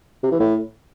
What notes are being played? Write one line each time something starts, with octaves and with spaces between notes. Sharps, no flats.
C3
E3
A2